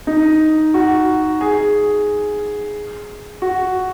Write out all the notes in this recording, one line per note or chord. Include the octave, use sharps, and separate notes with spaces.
D#4
F#4
G#4
F#4